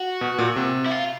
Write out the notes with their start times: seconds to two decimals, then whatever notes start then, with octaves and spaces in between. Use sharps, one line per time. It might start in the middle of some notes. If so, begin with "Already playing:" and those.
Already playing: F#4
0.21 B2
0.38 A#2
0.56 C3
0.86 E4
0.91 F4